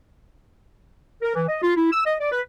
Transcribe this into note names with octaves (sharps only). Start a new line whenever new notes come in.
A#4
E3
D#5
F4
E4
E6
D#5
D5
B4